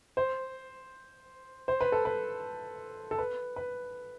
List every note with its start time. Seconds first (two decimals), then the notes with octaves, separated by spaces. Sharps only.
0.17 C5
1.68 C5
1.81 B4
1.92 A4
2.05 B4
3.11 A4
3.18 B4
3.56 B4